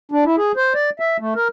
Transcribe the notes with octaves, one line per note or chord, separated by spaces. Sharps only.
D4
E4
G#4
C5
D5
E5
A3
A#4